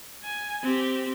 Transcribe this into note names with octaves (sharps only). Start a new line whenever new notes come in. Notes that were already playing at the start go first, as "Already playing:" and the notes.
G#5
C4 G4